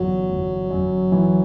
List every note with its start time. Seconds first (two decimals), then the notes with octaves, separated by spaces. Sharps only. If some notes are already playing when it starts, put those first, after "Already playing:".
Already playing: G1 F#2 E3 F#3
0.30 G1
0.71 F#2
1.12 E3